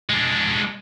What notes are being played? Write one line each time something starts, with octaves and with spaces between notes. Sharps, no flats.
G#3 D4